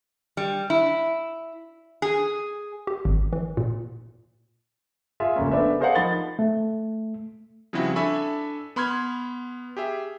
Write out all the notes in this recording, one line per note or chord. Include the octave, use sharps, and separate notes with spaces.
G3
E4
G#4
G4
G#1
E3
A#2
F4 G#4 E5
F1 C#2 A#3 C#4
A3 B3 D4 B4 E5
G#4 A#4 C5 D5 F5 F#5
F3 D#4 B5 A6 G7
A3
C#3 F3 G3 C4 E4 F#4
D4 A4 E5 G#5 B5 C#6
B3 B5 C6 F6 G#6
G4 G#4 E5